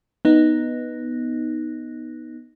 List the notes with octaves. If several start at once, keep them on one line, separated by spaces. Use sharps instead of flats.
B3 D#4